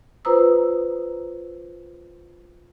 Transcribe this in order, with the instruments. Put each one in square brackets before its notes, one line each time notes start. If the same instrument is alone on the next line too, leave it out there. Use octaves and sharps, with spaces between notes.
[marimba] F4 B4 C5 A#5 D#6 E6